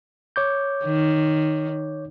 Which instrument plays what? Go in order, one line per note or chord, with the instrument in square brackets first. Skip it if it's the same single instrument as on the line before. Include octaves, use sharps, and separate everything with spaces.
[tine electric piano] C#5 D6 G6
[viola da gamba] D#3